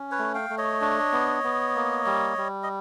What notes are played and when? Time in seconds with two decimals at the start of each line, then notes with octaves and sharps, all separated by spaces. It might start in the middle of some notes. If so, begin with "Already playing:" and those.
Already playing: C#4
0.11 B4 C#5
0.19 A3
0.34 F5 G5
0.50 A3
0.58 C#5 D#5
0.81 D4
1.12 B3
1.44 B3
1.75 A#3
2.06 G3
2.37 G3
2.63 D#5